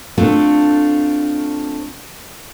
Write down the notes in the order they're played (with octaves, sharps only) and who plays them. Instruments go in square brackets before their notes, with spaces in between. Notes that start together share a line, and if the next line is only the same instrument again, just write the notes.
[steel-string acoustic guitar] A3 C4 D4 F4 A4